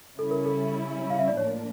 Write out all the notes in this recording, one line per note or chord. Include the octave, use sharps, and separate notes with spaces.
C#3 G3 C#4 E4 A4
A#4
A4
F5
E5
D5
A2 F3 A#3 D4 C#5